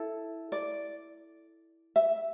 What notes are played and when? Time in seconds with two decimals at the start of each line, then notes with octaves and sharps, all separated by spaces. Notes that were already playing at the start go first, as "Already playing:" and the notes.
Already playing: E4 A4
0.52 D5
1.96 E5